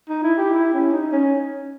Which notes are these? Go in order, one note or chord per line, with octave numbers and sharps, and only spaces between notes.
D#4
E4
G4
E4
C#4
D#4
C#4